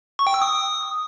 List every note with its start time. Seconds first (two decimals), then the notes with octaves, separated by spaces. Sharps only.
0.19 C#6
0.27 G5
0.34 E6
0.42 D#6